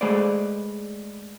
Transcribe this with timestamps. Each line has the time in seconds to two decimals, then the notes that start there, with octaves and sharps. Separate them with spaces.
0.01 G#3 A3 G#4 B4 C5 D5